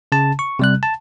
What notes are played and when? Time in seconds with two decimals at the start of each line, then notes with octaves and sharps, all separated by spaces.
0.12 C#3 A5
0.39 C#6
0.59 C3 G3 F#6
0.83 A5